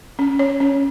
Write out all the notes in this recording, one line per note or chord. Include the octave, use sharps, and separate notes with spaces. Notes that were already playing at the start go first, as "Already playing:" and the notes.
C#4
C#5
C#4